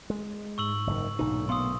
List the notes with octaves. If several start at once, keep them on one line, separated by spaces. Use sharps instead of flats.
G#3
G#2 C#6 E6 F#7
F#1 D#3
B1 A#2 D3 D#4
A3 B3 F5 C6 D#6